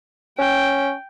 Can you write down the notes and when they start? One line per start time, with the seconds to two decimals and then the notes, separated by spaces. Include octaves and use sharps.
0.39 C#4 G5